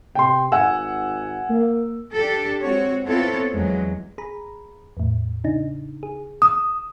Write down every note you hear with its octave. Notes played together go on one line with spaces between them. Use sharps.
C3 G5 C6
G#1 F#5 G#5 E6
A#3
D4 G4 A4
G#3 C4 F#4 C#5
B3 C4 E4 F4 A4 C#5
E2 F#3 G#3
G#4 A#5 B5
E2 A2
C#3 D4 D#4
G#4
D#6 E6 E7